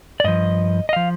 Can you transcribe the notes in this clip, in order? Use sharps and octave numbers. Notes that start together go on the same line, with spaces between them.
D5
G2 F3 D#5
D#5
F3 F5